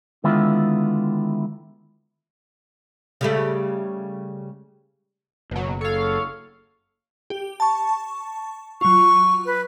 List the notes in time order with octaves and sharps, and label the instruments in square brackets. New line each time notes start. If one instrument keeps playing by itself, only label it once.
[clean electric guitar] D3 D#3 G#3 B3 E4 F4
[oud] C#3 G3 A3
[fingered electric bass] F#1 [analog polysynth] B2 F#3
[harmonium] A4 [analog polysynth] C#5 F5
[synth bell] G4
A5 C#6
[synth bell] F#3 F4 [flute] C#6
[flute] B4